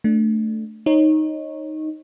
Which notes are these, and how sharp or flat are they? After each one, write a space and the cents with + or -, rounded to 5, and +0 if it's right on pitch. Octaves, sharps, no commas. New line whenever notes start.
A3 +0 D4 +5
D#4 +0 C#5 -20